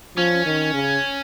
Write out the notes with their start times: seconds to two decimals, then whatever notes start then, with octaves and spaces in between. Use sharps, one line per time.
0.17 F3 C#4
0.46 D#3
0.74 C#3